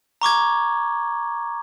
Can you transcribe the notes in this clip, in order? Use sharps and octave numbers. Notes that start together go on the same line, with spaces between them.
A#5 C#6 D6 G#6